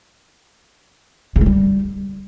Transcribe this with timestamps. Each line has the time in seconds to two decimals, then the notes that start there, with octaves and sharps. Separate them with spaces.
1.36 C#3
1.41 G#3
1.46 G3